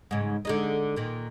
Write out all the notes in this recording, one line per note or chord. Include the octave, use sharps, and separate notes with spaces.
G#2 C#3
D3 G#3 D#4
A#2 D#3